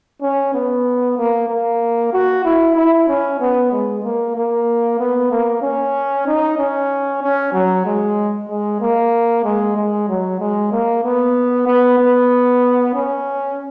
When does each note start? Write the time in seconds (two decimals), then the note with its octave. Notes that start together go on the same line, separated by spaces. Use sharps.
0.22 C#4
0.54 B3
1.18 A#3
1.49 A#3
2.13 F#4
2.45 E4
2.76 E4
3.08 C#4
3.40 B3
3.72 G#3
4.03 A#3
4.35 A#3
4.99 B3
5.31 A#3
5.62 C#4
6.27 D#4
6.58 C#4
7.22 C#4
7.53 F#3
7.85 G#3
8.49 G#3
8.81 A#3
9.44 G#3
9.77 G#3
10.08 F#3
10.40 G#3
10.72 A#3
11.04 B3
11.67 B3
11.98 B3
12.94 C#4